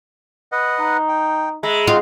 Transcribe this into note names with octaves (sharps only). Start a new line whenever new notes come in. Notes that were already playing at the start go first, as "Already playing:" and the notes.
B4 D#5 F#5
D#4
G5
G#3 E5 A#5 B5
C4 D#4 F4 F#4 D#5